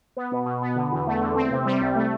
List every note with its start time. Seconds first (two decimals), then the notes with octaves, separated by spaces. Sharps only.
0.17 B3
0.32 B2
0.46 B2
0.62 B3
0.76 D3
0.92 E2
1.07 A3
1.21 D3
1.36 C4
1.51 C3
1.65 G3
1.81 C2
1.96 A3